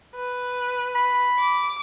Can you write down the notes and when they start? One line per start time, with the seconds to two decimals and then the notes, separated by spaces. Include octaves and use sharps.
0.16 B4
0.95 B5
1.39 D6